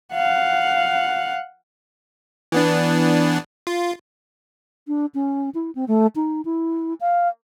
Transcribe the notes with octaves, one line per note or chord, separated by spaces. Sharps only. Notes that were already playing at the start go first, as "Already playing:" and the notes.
F5 F#5
E3 B3 D4
F4
D4
C#4
E4
C4
A3
D#4
E4
F5